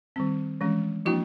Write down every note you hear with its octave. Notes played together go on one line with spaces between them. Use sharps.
D#3 G3 C4
E3 G#3 C#4
F3 A#3 D4 E4 F#4